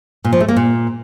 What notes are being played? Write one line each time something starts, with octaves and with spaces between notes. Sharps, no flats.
A#2
F3
A3
A#3
A#2